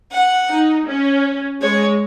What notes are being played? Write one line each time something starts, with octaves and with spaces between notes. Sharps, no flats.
F#5
D#4
C#4
G#3 C#5